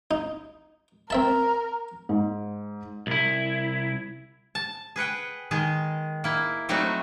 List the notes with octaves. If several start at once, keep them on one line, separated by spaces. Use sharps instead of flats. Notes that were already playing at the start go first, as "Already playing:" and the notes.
D#4
C4 A#4 E5 A5
G#2
C2 E4
A5
G#4 B4 F#5 G5
D#3 G#3 G#4
A#3 E4
F#3 G3 A3 C4 D#4 F#4